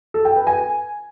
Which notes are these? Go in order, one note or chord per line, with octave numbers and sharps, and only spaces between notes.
A4
G5
B4
G#5